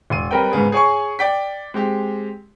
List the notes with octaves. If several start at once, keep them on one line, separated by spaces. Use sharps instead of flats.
E1 C6 D#7
G3 C4 A#4 B4 G5
G#2 C#3 B3 G#4
G#4 C#5 G#5 C#6
D5 G5 B6
G#3 C4 G4